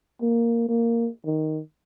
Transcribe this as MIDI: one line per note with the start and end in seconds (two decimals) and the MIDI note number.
0.22 0.68 58
0.69 1.09 58
1.26 1.60 51